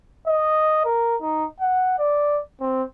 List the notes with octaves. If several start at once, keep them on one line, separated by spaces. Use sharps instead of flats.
D#5
A#4
D#4
F#5
D5
C4